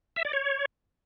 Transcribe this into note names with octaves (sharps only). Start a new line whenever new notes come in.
E5
D5
C#5